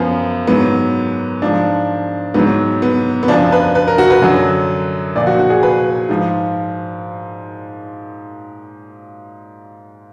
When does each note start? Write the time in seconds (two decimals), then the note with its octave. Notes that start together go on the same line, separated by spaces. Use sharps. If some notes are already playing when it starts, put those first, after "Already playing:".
Already playing: F#2 F3 B3
0.47 G#2 F#3 B3
1.42 G#2 F3 D4
2.34 G#2 F#3 B3
2.82 B3
3.23 B3
3.28 F#2 F3 D4
3.52 B4
3.75 B4
3.88 A#4
3.98 F#4
4.10 B4
4.22 F#2 D3 F#3
5.16 A#2 F3 D5
5.27 F#4
5.39 F#4
5.50 G#4
5.63 B4
6.09 G#2 F3